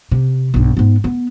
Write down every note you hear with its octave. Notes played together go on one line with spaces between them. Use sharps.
C3
B1 G2
G#2 B3
B3